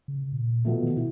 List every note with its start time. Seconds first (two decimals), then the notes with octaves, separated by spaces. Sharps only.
0.08 C#3
0.32 A#2
0.65 B2 F3 A3
0.83 D#3
0.97 B2 E4